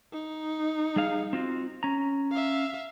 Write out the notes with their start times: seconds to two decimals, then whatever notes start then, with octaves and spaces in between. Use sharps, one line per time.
0.13 D#4
0.96 G3 G#4 F5
1.33 C4 F4 F#4
1.83 C#4 A#5
2.31 E5 F5